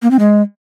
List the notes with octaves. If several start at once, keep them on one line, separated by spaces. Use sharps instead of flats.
A#3
C4
G#3